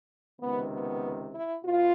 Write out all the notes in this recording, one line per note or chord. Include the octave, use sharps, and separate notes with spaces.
C#2 C3 D#3 B3
B3
E4
B2 F4